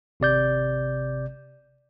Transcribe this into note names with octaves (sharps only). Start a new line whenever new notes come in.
G#1 C3 D5 G6